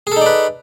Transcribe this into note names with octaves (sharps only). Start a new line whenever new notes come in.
D#4 G#4 A4 B4 D5